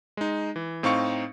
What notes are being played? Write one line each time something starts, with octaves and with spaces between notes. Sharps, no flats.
G#3 D#4
E3
A2 C4 D#4 F5 C#6 C#7